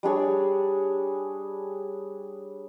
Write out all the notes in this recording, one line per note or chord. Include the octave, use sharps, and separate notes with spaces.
G3 D4 G#4 C#5